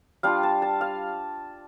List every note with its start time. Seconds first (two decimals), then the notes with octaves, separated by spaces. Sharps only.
0.23 G3 D4 F4 F5
0.43 A5
0.62 A5
0.81 F5